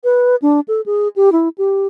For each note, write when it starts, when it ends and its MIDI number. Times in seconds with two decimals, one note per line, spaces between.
0.04 0.36 71
0.42 0.60 62
0.68 0.81 69
0.86 1.08 68
1.16 1.32 67
1.32 1.49 64
1.58 1.87 67